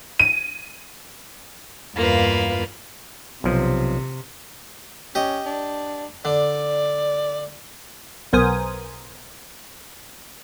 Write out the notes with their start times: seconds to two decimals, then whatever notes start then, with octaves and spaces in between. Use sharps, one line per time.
0.20 D#7
1.96 E2 G2 A#3 F4 B4
3.44 B1 C3 F3
5.15 C#4 G4 D#5
5.46 D4
6.25 D3 D5
8.33 B1 B3 A#4 C5 G#5 D#6